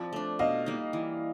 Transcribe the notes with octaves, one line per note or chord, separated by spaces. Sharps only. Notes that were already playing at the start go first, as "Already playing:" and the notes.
Already playing: F3 C4 D5
A3 D4
B2 D#5 F5
G3 A#3 D#4
E3